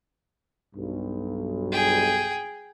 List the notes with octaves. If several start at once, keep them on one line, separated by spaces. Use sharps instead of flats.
B1 G2
G#4 G5